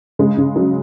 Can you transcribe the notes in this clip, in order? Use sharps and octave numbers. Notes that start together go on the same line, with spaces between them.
C#3 G#3
C#3
F#3